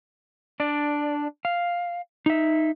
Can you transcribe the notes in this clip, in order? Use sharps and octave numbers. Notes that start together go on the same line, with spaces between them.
D4 D5
F5
D#4 E5